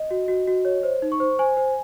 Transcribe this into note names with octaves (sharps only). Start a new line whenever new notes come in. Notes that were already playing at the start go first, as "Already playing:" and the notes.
Already playing: D#5
F#4
F#4
F#4
C#5
C5
D#4
C#6
C5
C5 G#5
C5